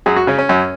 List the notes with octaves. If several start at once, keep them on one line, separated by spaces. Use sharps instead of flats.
F#2 G#4
F#4
C#3 C#4
C#4
F#2